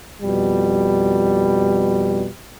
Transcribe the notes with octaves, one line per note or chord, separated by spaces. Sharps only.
F2 B2 G3